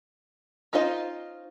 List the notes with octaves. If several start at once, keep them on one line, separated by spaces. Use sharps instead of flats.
C#4 D#4 F4 C5 D#5